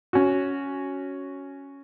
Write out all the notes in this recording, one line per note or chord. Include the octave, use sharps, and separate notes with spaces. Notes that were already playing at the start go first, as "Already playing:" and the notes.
C#4 F#4